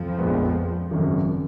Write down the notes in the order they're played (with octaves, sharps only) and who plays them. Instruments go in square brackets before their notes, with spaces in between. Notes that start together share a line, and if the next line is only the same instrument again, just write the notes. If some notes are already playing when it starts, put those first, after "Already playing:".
Already playing: [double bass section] F2 F3
[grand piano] A#1 A#2 G#3 B3
G#1 F#2 C#3